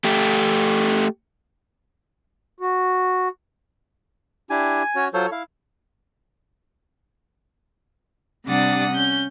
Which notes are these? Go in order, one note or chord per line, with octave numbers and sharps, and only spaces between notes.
A3 G4
F#4
D4 E4 G4 G#5
C#4 F#4 C#5
F#3 F4 A4 C5 C#5
E4 F5
C3 G3 D4 F#5 D#6 A6
C#4 G6